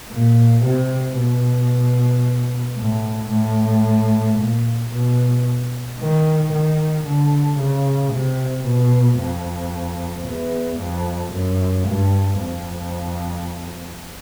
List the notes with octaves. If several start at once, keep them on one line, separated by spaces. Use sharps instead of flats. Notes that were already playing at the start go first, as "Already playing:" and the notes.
A#2
C3
B2
A2
A2
A#2
B2
D#3
D#3
D3
C#3
C3
B2
F2
E2
F2
F#2
G2
F2